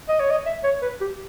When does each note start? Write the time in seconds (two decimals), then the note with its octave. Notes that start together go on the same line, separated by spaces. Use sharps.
0.09 D#5
0.20 C#5
0.31 D#5
0.46 E5
0.64 C#5
0.82 B4
1.01 G4